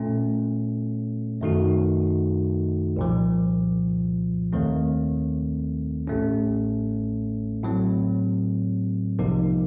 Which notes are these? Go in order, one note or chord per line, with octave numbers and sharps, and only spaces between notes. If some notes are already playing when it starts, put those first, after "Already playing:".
Already playing: A#2 A3 C#4
F#2 D#3 A3 D#4 F#4
C2 A#2 F3
D#2 D#3 A3 C4
A1 A2 A3 C#4
A2 F#3 C4
C2 C3 F3 A#3 D#4